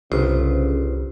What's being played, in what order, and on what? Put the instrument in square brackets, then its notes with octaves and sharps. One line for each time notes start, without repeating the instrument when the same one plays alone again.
[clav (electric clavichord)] G1 [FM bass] C2 [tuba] C#3 [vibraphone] C5